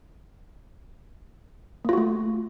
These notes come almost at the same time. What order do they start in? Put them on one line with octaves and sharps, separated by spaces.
A#3 F4 F#4 A3